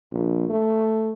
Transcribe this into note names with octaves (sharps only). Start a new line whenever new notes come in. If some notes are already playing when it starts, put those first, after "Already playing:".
A#1
A3